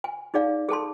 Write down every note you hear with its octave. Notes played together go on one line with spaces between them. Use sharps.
G#5
D#4 G#4 D5 F5
G#4 A4 A5 C6